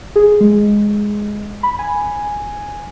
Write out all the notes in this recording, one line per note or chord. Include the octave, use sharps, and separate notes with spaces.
G#4
G#3
B5
G#5